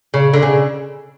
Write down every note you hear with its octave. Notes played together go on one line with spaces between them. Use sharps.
C#3
D3
C#3